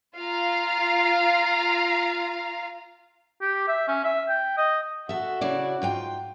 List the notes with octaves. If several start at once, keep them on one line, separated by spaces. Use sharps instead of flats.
F4 F5 A#5
G4
E5
C#4
E5
G5
D#5
F#4 A4 E5
C#3 E4 D5
G#2 F4 G5